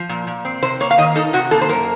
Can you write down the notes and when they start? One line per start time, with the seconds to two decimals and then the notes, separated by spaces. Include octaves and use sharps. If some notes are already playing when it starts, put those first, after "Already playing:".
Already playing: F3
0.09 A#2
0.27 A#2
0.45 C4
0.62 C3 C5
0.80 A#3 C#5
0.91 F5
0.98 D#3 D#5
1.16 D#4 A4
1.33 C3 F#4
1.51 A#3 A4
1.61 C5
1.69 F#2 A#4